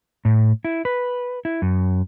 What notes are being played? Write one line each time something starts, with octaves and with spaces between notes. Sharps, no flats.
A2
E4
B4
E4
F#2